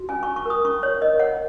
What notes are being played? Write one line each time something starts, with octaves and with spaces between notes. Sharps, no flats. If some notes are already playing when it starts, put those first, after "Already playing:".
Already playing: F#4
C#4 G#5
C#4 C#6
C#6
A#4 D#6
C#4 C#6
C#5
A#4 D#5
C#5 F#5